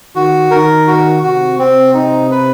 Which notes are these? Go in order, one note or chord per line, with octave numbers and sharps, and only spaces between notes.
D#3 F#4
D#3 A#4
F#4
C3 F#4
C4
D#4
B4